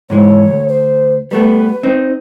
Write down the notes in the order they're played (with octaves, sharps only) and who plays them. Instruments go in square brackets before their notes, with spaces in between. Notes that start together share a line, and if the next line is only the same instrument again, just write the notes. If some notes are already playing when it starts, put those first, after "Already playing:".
[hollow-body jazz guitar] G#2 E3 G#3 [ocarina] C#5
[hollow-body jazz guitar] D2
[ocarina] C5
[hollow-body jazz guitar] G3 A3 B3 [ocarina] B4
[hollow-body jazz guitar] C4 D#4